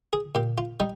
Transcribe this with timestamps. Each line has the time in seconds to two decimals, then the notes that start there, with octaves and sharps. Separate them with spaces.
0.13 G#4
0.35 A#2 G4
0.58 F4
0.80 G3 D#4